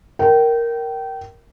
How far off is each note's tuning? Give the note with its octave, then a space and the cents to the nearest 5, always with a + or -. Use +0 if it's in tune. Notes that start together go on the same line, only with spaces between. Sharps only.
A#4 +0 G5 -25